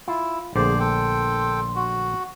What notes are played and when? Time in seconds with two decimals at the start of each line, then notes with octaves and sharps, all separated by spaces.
0.08 E4 F4
0.56 A#1 D3 A3 G#4 C5 D5
0.79 A4 G5 C6
1.75 F#4